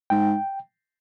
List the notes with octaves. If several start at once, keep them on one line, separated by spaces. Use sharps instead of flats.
G#2 G5